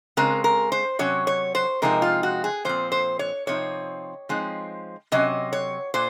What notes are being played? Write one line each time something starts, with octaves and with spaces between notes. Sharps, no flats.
C#3 G#3 C4 A#4
A#4
C5
C3 F#3 C#4 C#5
C#5
C5
C3 F3 G#3 C4 D#4 A#4
F4
F#4
G#4
A#2 F3 C4 C5
C5
C#5
C3 F3 C4 D#4 C#5
F3 G#3 C4 D#4
C3 F#3 C#4 D#5
C#5
A#2 C5